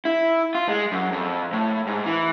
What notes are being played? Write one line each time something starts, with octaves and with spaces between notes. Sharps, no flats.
E4
F4
G#3
F#2
F2
A2
G#2
E3